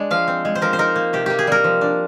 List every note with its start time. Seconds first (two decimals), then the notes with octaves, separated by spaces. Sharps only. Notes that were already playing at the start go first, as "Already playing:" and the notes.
Already playing: G#3 D4
0.11 F3 F5
0.28 C4
0.45 G#3
0.55 C5
0.62 F3 A#4
0.73 C5
0.79 D#4 A#4
0.96 A#3
1.13 C3 G4
1.26 A#3 G4
1.39 G#4
1.47 G3 A#4
1.64 F3
1.81 D4